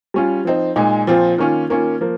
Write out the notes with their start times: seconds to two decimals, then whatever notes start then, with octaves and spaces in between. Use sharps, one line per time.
0.14 G3 C#4 F4
0.45 F3 C4 D#4
0.76 A#2 G#3 D#4
1.07 A#2 F3 C4 F4
1.38 D#3 A#3 C#4 F4
1.70 D#3 A#3 C#4 F4
2.01 F3 A#3